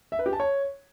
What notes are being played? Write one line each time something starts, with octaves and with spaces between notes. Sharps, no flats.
E5
B4
G4
A5
C#5